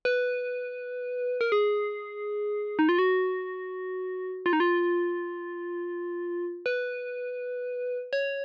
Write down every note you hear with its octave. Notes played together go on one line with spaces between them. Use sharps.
B4
A#4
G#4
D#4
F4
F#4
F4
D#4
F4
B4
C#5